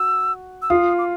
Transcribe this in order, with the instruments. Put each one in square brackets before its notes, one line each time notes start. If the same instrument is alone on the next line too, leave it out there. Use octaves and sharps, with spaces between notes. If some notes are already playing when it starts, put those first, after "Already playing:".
Already playing: [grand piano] F#4 [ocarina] E6
[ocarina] E6
[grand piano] F4 [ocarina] D#6
[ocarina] D6